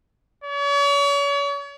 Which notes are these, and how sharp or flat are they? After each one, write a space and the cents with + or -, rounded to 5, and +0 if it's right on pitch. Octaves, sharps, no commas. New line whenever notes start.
C#5 +40